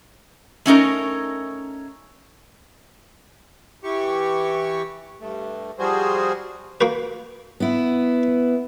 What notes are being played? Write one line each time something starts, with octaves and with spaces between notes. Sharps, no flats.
A3 C#4 D#4 A#4
E3 G4 C#6
G2 A3
F3 G3 F#4 G#4 C5
A#3 F#4 B4
B3 E4